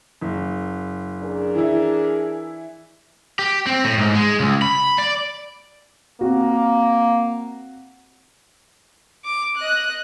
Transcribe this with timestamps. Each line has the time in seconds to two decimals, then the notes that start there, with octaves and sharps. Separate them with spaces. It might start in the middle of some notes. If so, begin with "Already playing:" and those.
0.21 F#1
1.20 D4 G#4 A#4
1.55 E3 E4
3.39 G4
3.67 C4
3.85 A2
3.98 G#2
4.15 G#3
4.40 C#2
4.62 B5
4.98 D5
6.21 A#3 C4 F#4
9.25 D6
9.57 D#5 F#6